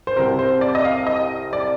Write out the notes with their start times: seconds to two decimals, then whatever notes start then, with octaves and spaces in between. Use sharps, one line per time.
0.07 C5
0.16 C2 C3 G3 C4 A#4
0.39 C5
0.61 D5
0.75 D#5
0.84 F5
1.07 D#5
1.53 D5